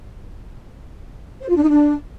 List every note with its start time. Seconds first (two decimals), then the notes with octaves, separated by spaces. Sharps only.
1.42 C5
1.49 F4
1.56 D4
1.63 D#4
1.70 D4